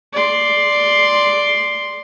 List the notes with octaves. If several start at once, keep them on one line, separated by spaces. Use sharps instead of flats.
D5 C6